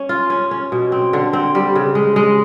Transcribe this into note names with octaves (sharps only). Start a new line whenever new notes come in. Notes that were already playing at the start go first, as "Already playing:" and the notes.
Already playing: C#4
F4
C#4
C#4
B2
C4
D3
C4
G3
C#3
G#3
G#3